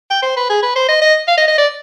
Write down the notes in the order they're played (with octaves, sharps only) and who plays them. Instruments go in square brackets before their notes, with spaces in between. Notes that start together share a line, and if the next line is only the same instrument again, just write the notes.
[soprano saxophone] G5
C5
B4
G#4
B4
C5
D#5
D#5
F5
D#5
D#5
D5